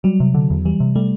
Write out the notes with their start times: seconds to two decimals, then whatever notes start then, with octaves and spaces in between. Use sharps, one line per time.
0.04 F#3 G3
0.20 C3
0.34 D3
0.50 E2
0.65 E3 G3
0.80 C3
0.95 G3 A3